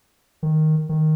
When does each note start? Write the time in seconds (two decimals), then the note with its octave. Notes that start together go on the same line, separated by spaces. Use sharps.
0.43 D#3
0.89 D#3